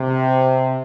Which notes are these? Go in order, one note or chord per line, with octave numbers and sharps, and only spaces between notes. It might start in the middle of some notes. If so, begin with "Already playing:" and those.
Already playing: C3